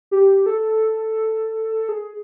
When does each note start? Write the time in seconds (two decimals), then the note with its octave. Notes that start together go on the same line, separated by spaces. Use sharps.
0.11 G4
0.46 A4
1.89 G#4